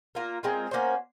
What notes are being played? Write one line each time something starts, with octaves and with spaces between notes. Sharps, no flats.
A#3 F4 A#4
G#3 C4 F4 A#4
A#3 C#4 F#4 C5